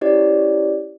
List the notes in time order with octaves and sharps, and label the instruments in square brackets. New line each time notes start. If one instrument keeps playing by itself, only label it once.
[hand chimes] C#4 E4 G4 C#5 D5